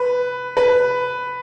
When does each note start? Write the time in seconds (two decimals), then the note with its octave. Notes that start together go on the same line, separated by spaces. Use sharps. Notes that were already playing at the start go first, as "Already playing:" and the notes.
Already playing: B4
0.57 B4